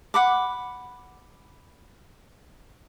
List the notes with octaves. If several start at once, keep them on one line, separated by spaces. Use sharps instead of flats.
F#5 B5 D6